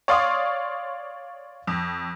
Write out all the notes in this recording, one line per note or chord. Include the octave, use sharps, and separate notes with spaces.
C#5 D5 F5 C6 D#6
F2